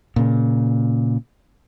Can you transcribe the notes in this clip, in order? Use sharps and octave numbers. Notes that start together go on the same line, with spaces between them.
A#2 C#3